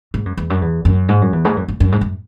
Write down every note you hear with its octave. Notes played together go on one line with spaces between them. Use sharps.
G#2
F#2
E2
F#2
E2
F#2
G#2
F#2
E2
G#2
F#2
F#2
F#2
G#2
F#2